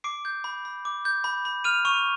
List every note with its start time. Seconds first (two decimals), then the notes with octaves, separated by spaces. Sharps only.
0.04 D6 C7 D7
0.25 G6
0.44 B5
0.65 B5
0.85 D6
1.05 G6
1.24 B5
1.45 B5
1.64 F6 D#7 F7
1.85 C#6 D#7 F7